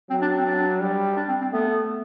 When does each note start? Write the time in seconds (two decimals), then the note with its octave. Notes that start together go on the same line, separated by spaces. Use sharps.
0.10 F#3 C4
0.22 D4
0.38 C4
0.46 D4
0.80 G3
1.17 D4
1.29 C4
1.41 C4
1.52 A3 B3